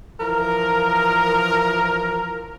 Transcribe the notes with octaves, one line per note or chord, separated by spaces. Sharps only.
E3 F3 A#4